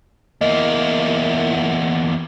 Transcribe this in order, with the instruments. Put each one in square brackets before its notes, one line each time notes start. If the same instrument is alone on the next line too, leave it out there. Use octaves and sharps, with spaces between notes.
[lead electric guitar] E2 A#3 [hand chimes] D#5